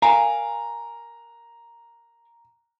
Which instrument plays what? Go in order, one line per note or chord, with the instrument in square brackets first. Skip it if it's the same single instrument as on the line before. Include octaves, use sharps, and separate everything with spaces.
[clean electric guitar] A#4 F5 G#5 [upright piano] A#5